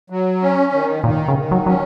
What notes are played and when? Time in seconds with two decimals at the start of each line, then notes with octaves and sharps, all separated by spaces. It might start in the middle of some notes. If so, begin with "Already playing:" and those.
0.10 F#3
0.41 C#4
0.72 D#3
1.03 A#2 D#3
1.28 C#3
1.36 D#3
1.51 F#3
1.66 F#3 C#4